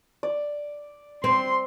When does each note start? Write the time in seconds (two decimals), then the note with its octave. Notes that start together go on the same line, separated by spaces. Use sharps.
0.23 D5
1.24 C4 C6